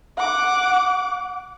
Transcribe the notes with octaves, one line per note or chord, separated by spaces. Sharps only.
F#5 D6